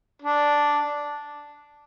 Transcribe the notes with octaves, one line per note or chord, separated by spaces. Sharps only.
D4